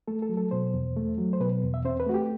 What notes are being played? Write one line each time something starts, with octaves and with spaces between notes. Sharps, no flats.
A3 A4
A4
F#3
A4
B2 C5
E2
A3
F#3
C5
B2 B4
E2
E5
C4 C5
B4
A3 F#4
G4